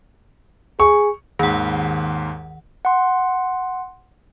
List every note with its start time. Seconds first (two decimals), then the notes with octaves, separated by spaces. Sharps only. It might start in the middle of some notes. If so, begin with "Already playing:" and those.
0.80 G#4 C#6
1.39 D#2 G#2 D#3 F#5
2.85 F#5 C6